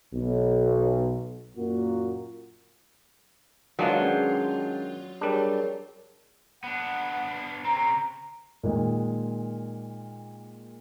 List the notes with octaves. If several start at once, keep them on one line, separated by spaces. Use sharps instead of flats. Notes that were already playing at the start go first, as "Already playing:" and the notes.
B1
F#2 A#2 A#3 F#4
D#3 F#3 G#3 D4 F4 B4 D5
C#4 G#4 G6
G3 D4 G#4 A#4 C#5
B3 D4 F#5
C#3 C4 A#5
A#2 D#3 G#3